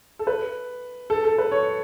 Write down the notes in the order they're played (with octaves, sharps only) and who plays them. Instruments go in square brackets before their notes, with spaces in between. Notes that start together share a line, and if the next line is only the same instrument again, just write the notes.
[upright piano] A4
B4
A4
A4
B4
C#5